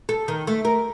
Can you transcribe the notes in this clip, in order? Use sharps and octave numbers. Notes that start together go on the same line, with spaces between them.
A4
D#3
A3
A#4